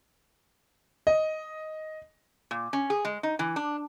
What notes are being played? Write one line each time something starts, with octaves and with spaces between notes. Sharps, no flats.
D#5
A#2
C#4
G#4
G#3
D#4
E3
D4